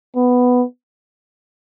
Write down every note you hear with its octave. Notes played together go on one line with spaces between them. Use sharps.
B3